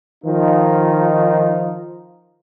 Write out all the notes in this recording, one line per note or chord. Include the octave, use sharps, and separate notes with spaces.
D#3 F3 D#4 F4